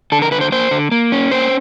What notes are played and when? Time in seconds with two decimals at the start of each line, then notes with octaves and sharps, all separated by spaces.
0.12 D3 A4
0.22 A#4
0.31 D3 B4
0.41 C5
0.52 A#3 C5
0.71 D3
0.91 A#3
1.12 C#4
1.31 A#3 C5